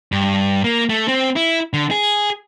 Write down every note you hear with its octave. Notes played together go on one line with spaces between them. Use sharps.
G2
A#3
A3
C4
E4
D3
G#4